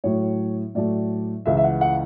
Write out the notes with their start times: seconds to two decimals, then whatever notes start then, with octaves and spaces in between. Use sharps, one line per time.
0.04 A2 F#3 A3 C#5
0.75 A2 F#3 A3 D5
1.46 C#2 C#3 E3 E5
1.57 E5
1.64 F#5
1.81 F#5